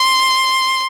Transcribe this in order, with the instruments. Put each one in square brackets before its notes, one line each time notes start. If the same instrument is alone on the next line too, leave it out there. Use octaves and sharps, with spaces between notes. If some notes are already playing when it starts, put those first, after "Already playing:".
Already playing: [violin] C6